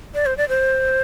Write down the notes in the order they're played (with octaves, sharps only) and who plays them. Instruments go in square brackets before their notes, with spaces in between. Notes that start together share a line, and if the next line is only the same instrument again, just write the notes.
[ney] D5
C5
D5
C5